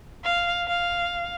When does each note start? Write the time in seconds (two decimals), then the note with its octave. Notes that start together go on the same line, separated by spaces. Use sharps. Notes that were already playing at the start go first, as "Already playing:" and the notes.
0.24 F5
0.67 F5